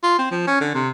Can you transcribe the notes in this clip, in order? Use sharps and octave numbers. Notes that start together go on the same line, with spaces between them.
F4
C4
F3
C#4
D3
C3